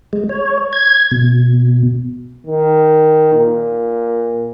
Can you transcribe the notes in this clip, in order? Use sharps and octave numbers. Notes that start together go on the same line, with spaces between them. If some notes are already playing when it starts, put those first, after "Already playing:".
G#3
C#5
G#6
B2
D#3
A#2